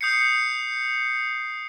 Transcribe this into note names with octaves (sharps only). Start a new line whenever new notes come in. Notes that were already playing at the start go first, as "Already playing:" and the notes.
D#6 G6 C7 C#7